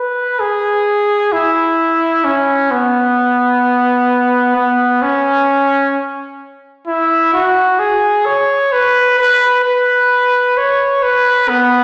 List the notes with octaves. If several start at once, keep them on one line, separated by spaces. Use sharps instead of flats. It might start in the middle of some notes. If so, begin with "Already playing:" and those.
Already playing: B4
G#4
E4
C#4
B3
B3
C#4
E4
F#4
G#4
C#5
B4
B4
B4
C#5
B4
B3